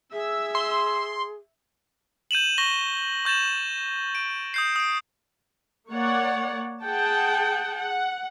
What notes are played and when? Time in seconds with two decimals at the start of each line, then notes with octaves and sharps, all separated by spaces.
0.12 G#4 E5 E6
0.55 C6
2.31 G6 D#7 E7 F#7
2.58 C#6 A#6 G7
3.25 C#6 G6 A6 E7 F#7
4.15 D7
4.54 D#6 G6 C7
4.76 D#6 D7
5.90 A#3 C#5 D5 F#5
6.83 G#4 F#5 G5 A5
7.77 F#5